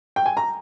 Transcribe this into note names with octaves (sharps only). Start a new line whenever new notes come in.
G5
G#5
A#5